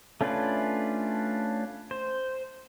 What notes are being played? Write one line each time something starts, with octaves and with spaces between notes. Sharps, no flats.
A3 C#4 D4 F4 B4
C5